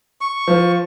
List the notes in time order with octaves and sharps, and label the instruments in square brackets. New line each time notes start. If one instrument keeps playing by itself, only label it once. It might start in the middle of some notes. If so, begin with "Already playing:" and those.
[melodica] C#6
[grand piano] F3